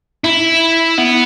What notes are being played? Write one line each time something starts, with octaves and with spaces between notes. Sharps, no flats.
E4
B3